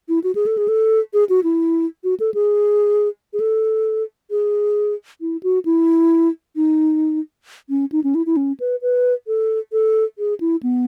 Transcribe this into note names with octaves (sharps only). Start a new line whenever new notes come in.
E4
F#4
G#4
A4
G#4
A4
G#4
F#4
E4
F#4
A4
G#4
G#4
A4
G#4
E4
F#4
E4
D#4
C#4
D#4
C#4
E4
E4
C#4
B4
B4
A4
A4
G#4
E4
B3